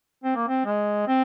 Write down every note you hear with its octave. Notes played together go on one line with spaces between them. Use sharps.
C4
A#3
C4
G#3
C4